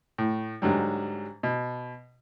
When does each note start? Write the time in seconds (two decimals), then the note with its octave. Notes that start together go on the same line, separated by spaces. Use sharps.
0.18 A2
0.62 G#2 D3 F#3 G3
1.43 B2